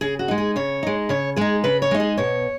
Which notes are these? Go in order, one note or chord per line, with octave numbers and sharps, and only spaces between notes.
C#3 G#4
F#4
G#3 D#4
G#4
C#3 C#5
G#3 D#4
C#3 C#5
G#3 D#4 G#4
C#3 B4
C#5
G#3 D#4
G#4
B2 C#5